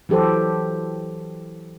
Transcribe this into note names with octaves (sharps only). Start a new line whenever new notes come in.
E3 F#3 G4 A4 C5